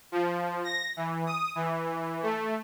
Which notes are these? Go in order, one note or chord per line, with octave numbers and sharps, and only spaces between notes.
F3
A#6
E3
D#6
E3
A3